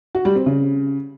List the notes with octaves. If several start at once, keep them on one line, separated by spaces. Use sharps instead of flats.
F#4
G3
C4
C#3